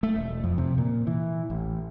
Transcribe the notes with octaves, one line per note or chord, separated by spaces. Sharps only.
A3
E1
F2
C3
A#2
E3
A1